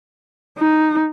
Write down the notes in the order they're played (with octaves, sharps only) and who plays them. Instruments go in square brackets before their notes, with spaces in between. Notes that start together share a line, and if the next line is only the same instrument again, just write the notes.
[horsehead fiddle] D#4